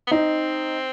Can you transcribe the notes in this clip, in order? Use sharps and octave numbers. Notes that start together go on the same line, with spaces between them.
B3
C4 D#4